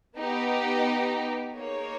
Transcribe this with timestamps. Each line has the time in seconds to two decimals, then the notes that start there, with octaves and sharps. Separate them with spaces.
0.16 B3 D#4 G4
1.57 A#3 D#4 G#4 C#5